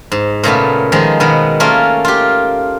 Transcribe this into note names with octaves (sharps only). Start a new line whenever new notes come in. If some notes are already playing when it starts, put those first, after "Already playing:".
G#2
A#2 C#3 A3 B3
D#3 F3 G#3 D#4
B2 D#3 B3
A3 A#3 C#4 F4
F4 G4